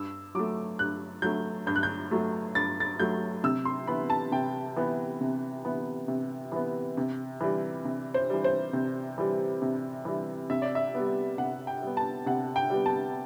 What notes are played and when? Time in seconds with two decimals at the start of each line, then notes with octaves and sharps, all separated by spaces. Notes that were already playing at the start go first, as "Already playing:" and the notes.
Already playing: G2 E6
0.35 F#3 A3 D6
0.79 G2 F#6
1.22 F#3 A3 G6
1.67 G2 G6
1.76 F#6
1.83 G6
2.11 F#3 A3
2.55 G2 A6
2.80 A6
2.99 F#3 A3 G6
3.44 C3 E6
3.65 C6
3.87 E3 B3 B5
4.10 A5
4.32 C3 G5
4.77 E3 B3
5.21 C3
5.65 E3 B3
6.08 C3
6.52 E3 B3
6.97 C3
7.41 E3 G3
7.85 C3
8.14 C5
8.30 E3 G3
8.44 C5
8.73 C3
9.18 E3 G3
9.62 C3
10.05 E3 G3
10.50 C3 E5
10.62 D5
10.75 E5
10.95 G3 B3
11.38 C3 F#5
11.67 G5
11.82 G3 B3
11.97 A5
12.26 C3 F#5
12.56 G5
12.70 G3 B3
12.86 A5